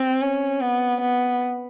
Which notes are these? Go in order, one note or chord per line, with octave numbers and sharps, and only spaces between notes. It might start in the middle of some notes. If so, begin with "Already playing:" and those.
Already playing: C4
C#4
B3
B3